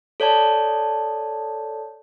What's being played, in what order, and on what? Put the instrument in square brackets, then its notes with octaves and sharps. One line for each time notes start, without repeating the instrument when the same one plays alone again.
[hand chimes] A4 C#5 D5 A5